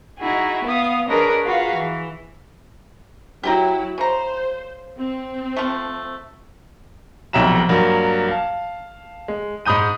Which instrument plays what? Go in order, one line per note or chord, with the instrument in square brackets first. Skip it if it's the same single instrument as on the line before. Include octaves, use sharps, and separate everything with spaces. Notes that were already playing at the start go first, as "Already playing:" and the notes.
[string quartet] D#4 E4 F#4 G#4
B3 F5 D#6
D4 G#4 A#4 B4 C#5 D#5
F4 F#4 G#4 B4 F5 A#5
E3
[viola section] F#3 E4 [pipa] G4 G5 A#5
[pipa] C#3 A#5 [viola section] C5
[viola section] C4
[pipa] F3 A3
[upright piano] F1 B1 F2 E5 A#5 E7
G2 F#3 A#3
F5 A5
G#3
G#2 B5 D#6 G6 D#7